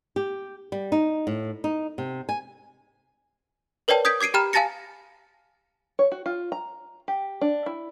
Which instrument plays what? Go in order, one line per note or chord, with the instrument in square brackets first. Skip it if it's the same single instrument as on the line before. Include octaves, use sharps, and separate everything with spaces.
[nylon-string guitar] G4
G3
D#4
A2
D#4
C3
G#5
[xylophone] A#4 B4 C#5 D5 G5 A5
D#6 G6 G#6 B6 D7
D6 G#6 C7 D7 D#7
G4 G5 A#5 B5 F6 E7
F5 G#5 A5 A6 A#6 C#7
[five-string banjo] C#5
F#4
F4
A#5
G4
D4
E4